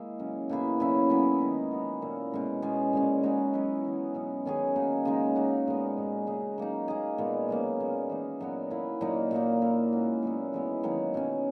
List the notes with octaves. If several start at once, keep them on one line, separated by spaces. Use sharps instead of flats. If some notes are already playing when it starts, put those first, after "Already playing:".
Already playing: G#3 A#3 E4 G#4
C#3 F#3 C#4
B2 A#3 E4 G#4
C#3 F#3 C#4 E4
F#3 B3 E4
D#3 G#3 D#4
F#3 B3 F#4 C#5
A#2 A#3 C#4 E4
B2 G#3 C#4 F#4
B2 G#3 C#4 G#4
A#2 G#3 C#4
G#3 D#4 F#4 C#5
F#3 B3 E4 B4
E3 B3 D#4
B2 F#3 C#4
D#3 F#3 C#4 G#4
A#3 D#4 F#4
C#3 G#3 D#4
A#3 D#4 F#4
A#2 G#3 B3
A#2 G#3 D#4
C#3 G#3 D#4 G#4
F#3 A#3 D#4
A#3 D#4 G#4
A#2 G#3 B3
B2 F#3 A#3 C#4
A#2 G#3 B3
E3 A#3 D#4
A#2 F#3 B3 F#4
A#3 E4 B4
A#2 F#3 A#3 D#4
A#2 F#3 A#3 D#4
A#3 E4 A#4 C#5
G#3 C#4 F#4
A#2 F#3 B3 E4
E3 G#3 B3 E4
D#3 F#3 A#3 D#4
B2 F#3 C#4